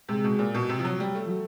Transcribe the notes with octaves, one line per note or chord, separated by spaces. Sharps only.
C3 G#3
B2
A#2
B2
C3
F3
F#3
G3
A3
F3
F#3